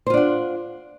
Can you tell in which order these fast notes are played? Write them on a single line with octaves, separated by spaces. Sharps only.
C5 F4 D4 F#5